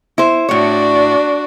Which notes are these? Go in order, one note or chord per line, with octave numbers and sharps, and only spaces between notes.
E4 C5
A2 D4 F#4 C#5 D5